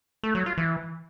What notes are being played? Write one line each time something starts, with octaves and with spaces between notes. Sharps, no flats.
A3
F#3
F4
E3